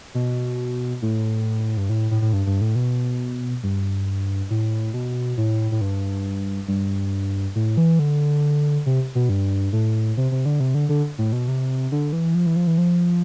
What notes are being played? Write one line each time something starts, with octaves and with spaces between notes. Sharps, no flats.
B2
A2
G2
A2
A2
A2
G2
G2
A2
B2
G2
A2
B2
A2
A2
G2
G2
A2
E3
D3
C3
B2
G2
A2
C3
C3
D3
C3
D3
D3
A2
B2
C3
D3
E3
F3
E3
F3
E3
F3